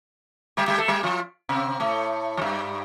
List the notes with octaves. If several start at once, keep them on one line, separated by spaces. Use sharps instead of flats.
G3 G4
G3 G4
A3 A4
G3 G4
F3 F4
C3 C4
A2 A3
F3
G2 G3